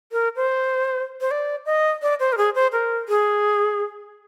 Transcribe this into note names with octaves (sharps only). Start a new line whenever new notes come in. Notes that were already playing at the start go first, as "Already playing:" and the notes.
A#4
C5
C5
D5
D#5
D5
C5
A#4
G#4
C5
A#4
G#4